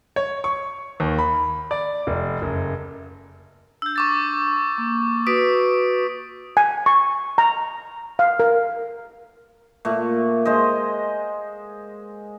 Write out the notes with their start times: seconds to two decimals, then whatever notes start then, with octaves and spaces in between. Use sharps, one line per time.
0.16 C#5
0.44 C#6
1.00 D#2
1.18 B5
1.71 D5
2.07 F1
2.42 F#1
3.82 D4 E6 G6
3.96 C#6 D6 A6
4.78 A#3
5.27 F#4 B4 D#6 B6 D7
6.57 G#5
6.86 C#6
7.38 A#5
8.19 F5
8.40 A#4
9.85 A#2 A3
10.45 G#3 C5 D#5